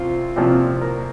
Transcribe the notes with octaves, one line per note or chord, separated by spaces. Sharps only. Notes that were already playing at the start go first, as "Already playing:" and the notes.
Already playing: C2 C4 F4
C2 A#2 F3 C4 G4
A#4